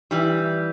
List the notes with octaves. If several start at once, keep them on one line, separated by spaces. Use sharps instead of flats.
E3 G3